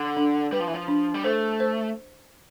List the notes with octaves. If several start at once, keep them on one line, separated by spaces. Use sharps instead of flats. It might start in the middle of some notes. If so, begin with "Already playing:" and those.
Already playing: D3
D4
G3 B4
F3
E3
F3
D4
G3
A3 C5
C5